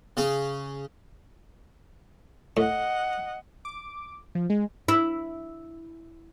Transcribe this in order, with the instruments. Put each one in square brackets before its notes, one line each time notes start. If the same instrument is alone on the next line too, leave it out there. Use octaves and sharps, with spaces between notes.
[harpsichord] C#3 C#4 G#4
[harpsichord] A2 [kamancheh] D#5 F#5
[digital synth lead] D6
F3
G#3
[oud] E4